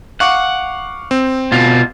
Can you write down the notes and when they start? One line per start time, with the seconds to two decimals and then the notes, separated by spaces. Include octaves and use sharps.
0.20 F5 F#5 C#6 D6
1.11 C4
1.52 B2 F4